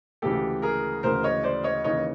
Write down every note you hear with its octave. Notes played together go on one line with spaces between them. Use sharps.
D2 C#3 E3 G#3 G4 A4
G#4 A#4
D2 C#3 E3 G#3 A#4 C5
C#5 D#5
C5 D5
C#5 D#5
D#2 C#3 E3 C#5 D#5